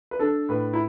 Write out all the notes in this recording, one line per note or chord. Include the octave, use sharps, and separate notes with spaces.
B4
D4 A4
A2 B4
E4